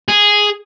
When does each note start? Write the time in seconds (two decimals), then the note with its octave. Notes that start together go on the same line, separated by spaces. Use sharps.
0.08 G#4